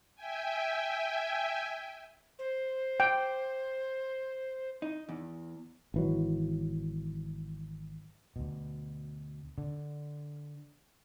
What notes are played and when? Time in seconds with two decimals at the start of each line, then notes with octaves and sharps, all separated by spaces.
0.15 E5 G5 G#5
2.39 C5
3.00 G5
4.82 D#4
5.09 E2
5.94 G#1 E3 F#3
8.36 D2 B2
9.58 D3